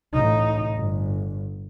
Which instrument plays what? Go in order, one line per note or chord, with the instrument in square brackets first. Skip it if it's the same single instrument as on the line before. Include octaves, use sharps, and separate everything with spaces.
[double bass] A1 D#4
G1